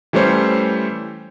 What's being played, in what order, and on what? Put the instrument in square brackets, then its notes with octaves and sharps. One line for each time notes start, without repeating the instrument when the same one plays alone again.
[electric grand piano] E3 G3 A3 C#4 C5 C#5